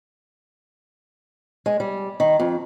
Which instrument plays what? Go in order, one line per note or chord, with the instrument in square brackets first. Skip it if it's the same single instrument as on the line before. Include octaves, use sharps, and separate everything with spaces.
[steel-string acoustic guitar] G#3
G3
D#3
F2